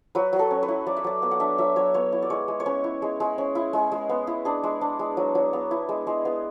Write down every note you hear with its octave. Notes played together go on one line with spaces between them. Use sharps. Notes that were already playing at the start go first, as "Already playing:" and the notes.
F#3 B4
F#3
A4
C#4
B4
E4
F#3 D5
E5
F#3 D5
B3 E5
F#5
D4 E5
F#3 E5
F#3 C#5
B3 C#5
E4
D5
G#3 C#5
G#3
C#5
C#4 B4
E4
G#3
G#3
C#4
E4
G#3
G#3
B3
E4
D4 G#4
G#3
D4
G#3
F#3
F#3
B3
E4
G#3
G#3
B3